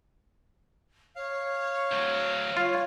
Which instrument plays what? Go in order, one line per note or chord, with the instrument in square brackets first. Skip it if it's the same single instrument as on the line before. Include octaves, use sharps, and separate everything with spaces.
[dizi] C#5 [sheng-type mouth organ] F5
[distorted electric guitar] D2 F#3
[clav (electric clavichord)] F4 [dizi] C#5